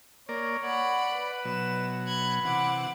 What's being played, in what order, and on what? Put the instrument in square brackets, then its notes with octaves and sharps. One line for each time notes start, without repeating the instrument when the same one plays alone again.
[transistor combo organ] A#3 A#4 D5 [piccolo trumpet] C#5
[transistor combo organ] D5 [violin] F#5 B5
[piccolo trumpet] B4
[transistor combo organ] B2 F#3 [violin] E7
[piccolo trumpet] B5 [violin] F#6 G#6
[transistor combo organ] C3 E3 [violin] F#5 D6